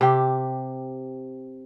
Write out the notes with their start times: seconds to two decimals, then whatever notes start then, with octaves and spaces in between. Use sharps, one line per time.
0.01 C3 G4